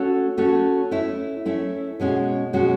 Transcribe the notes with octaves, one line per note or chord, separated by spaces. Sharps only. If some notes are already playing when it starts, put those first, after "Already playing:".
Already playing: A3 C#4 F#4 A4 C#5
A3 C#4 F#4 A4 C#5
A3 C#4 E4
A3 C#4 E4
B2 G#3 C#4 F#4
B2 G#3 C#4 F#4